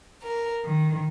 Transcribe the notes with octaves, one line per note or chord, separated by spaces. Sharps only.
A#4
D#3